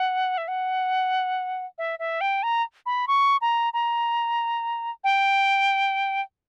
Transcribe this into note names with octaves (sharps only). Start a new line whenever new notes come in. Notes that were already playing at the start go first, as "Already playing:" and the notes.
Already playing: F#5
E5
F#5
E5
E5
G5
A#5
B5
C#6
A#5
A#5
G5